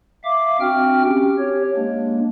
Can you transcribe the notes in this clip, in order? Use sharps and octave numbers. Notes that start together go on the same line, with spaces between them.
E5 F5 D6
C4 D4 F#4 G5 F6
C#4 G4
G4 C#5
G#3 A#3 D4